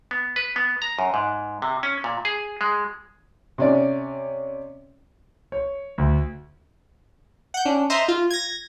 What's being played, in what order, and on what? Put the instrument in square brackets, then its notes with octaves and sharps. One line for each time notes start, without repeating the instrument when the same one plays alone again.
[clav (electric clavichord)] B3
B4
B3
A#5
F#2
G#2
C3
C#4
A#2
G#4
G#3
[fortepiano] C3 C#4 D5
[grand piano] C#5
D2
[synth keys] F#5 G6
C#4 D4
C5 D#5 E5 A#5 C6
F4
G#6 A#6